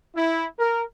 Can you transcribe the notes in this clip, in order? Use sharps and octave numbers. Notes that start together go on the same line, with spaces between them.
E4
A#4